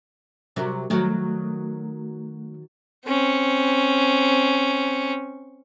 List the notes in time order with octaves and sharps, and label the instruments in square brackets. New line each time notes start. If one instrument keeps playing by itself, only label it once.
[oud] C3 F#3 A#4
[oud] D#3 F#3 [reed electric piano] A3
[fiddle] C4 C#4